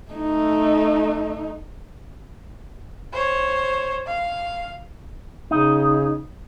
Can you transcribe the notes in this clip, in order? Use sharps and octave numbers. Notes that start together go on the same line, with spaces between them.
A3 D#4
C5 C#5
F5
C#3 D#4